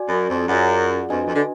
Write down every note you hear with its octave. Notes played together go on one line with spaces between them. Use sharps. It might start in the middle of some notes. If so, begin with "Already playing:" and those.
Already playing: F#4 D5 G#5
F#2
F2
F#2 F4 G#4 D5 F#5
F2 D4 F#4 B4 D#5 G#5
F2
D3